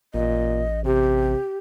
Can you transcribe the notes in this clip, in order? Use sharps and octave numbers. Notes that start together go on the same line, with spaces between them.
A1 A#2 D#5
C3 G4